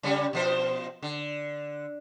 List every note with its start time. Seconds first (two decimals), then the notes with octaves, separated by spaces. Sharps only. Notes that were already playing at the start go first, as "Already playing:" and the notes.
0.03 C#3 G3 C#4
0.33 B2 F3 C5
1.02 D3